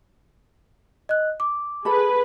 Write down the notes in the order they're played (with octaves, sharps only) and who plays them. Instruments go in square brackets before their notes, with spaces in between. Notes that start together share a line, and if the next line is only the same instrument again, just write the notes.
[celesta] D#5 F#6
D6
[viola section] G#4 B4 [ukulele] A4 B5